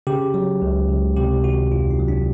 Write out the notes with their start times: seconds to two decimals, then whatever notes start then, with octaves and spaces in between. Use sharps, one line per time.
0.07 C#3 G4
0.34 F#3
0.62 C#2
0.89 C#2
1.17 C3 G4
1.44 D#3 F#4
1.72 E2 F4
1.91 D#4
1.99 F#3
2.08 D4